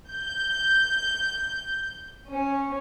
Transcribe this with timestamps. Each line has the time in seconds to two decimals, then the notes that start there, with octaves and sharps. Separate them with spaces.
0.13 G6
2.33 C#4